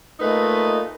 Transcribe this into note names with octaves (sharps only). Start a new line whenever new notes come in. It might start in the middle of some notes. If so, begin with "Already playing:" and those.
A#2 A3 D#4 B4 D#5